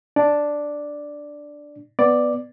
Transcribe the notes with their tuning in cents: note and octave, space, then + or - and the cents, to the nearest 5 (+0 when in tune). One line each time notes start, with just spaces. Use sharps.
D4 +0 D5 +0
B3 +0 D5 +5